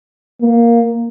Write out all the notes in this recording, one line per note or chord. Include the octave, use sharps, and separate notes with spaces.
A#3